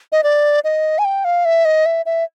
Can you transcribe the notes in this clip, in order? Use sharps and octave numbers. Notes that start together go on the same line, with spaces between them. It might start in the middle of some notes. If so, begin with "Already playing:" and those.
D#5
D5
D#5
G#5
G5
F5
E5
D#5
E5
E5